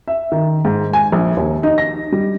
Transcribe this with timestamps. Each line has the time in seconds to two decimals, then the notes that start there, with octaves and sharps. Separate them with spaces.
0.08 E5
0.32 D#3
0.65 G#2
0.93 G#5
1.12 A#1
1.37 D#2
1.63 D#4
1.78 A#6
2.12 G3